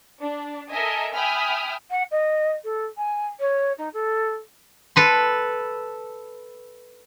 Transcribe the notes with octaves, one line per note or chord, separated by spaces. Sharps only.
D4
A4 A#4 D#5 E5 G#5
E5 G5 G#5 B5 D#6 F6
F#5
D#5
A4
G#5
C#5
D#4
A4
A4 B4 C6